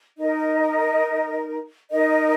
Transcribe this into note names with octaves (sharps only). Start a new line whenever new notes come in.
D#4 A#4 D#5
D#4 A#4 D#5